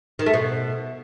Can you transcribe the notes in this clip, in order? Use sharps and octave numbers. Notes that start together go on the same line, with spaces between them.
D#3
A3
B2